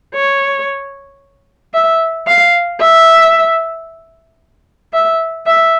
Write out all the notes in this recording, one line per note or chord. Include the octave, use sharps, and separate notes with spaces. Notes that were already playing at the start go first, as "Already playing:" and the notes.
C#5
E5
F5
E5
E5
E5